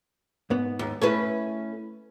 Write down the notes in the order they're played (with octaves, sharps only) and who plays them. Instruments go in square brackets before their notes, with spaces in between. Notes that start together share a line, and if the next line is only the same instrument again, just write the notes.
[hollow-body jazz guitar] G#2 B3
[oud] D#2
[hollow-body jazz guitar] A3 [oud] C#4 E4 B4